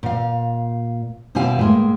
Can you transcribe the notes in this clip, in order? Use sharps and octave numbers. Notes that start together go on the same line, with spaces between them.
A#2 F5
D#2 B2 G3 E4 F5 G#5
A2 G#3 A#3